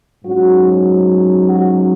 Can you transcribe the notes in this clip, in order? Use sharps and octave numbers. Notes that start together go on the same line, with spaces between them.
G#2 F#3 C#4 F#4
F#4